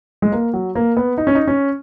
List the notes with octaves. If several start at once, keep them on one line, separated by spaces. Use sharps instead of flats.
G#3
A#3
F#3
A#3
B3
D#4
C#4
D#4
C#4